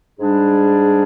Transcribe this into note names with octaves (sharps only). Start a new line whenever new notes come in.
G#2 G3 D4 G#4